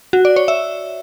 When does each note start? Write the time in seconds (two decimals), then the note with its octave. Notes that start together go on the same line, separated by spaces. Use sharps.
0.13 F#4
0.25 D5
0.36 C#5
0.48 E5